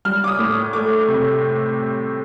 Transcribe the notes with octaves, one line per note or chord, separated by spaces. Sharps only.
G3 F6
D6
D#6
A2
A3 D6
C3